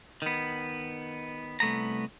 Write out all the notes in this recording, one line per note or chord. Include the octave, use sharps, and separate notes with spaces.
D#3 B3
C2 A3 B3 A#5